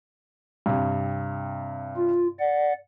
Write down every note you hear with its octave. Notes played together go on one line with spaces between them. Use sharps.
G2 C3
F4
D5 F#5